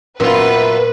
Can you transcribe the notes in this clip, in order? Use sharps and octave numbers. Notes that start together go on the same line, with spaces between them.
F#2 A#2 B3 F4 B4